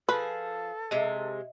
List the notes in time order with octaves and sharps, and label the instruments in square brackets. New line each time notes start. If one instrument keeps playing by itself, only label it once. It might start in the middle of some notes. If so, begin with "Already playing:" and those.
[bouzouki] F3 G#4 [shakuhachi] A4 [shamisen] B4
[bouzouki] C3 G#3 [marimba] D#5 E5